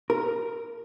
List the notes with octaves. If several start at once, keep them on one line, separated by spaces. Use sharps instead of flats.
A#4